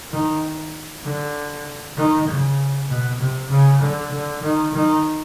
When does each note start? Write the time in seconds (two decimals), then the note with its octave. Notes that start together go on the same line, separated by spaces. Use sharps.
0.11 D#3
1.04 D3
1.96 D#3
2.27 C#3
2.88 B2
3.19 C3
3.50 C#3
3.81 D3
4.12 D3
4.42 D#3
4.73 D#3